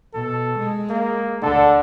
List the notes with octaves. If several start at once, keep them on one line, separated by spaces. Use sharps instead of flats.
B2 A4
G#3
A#3
D2 D3 A4